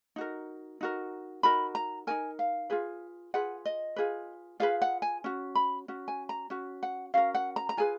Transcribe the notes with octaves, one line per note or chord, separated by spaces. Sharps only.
D#4 F#4 A#4
D#4 F#4 A#4
D#4 F#4 A#4 B5
A#5
D#4 F#4 A#4 G#5
F5
F4 G#4 B4
F4 G#4 B4 F#5
D#5
F4 G#4 B4
F4 G#4 B4 F5
F#5
G#5
C#4 F#4
B5
C#4 F#4
G#5
A#5
C#4 F#4
F#5
C#4 F#4 A#4 F5
F#5
A#5
A#5
F4 G#4 B4 G#5